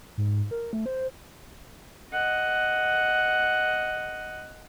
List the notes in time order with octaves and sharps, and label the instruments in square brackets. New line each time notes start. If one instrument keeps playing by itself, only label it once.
[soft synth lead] G#2
A#4
A3
C5
[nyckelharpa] D#5 F#5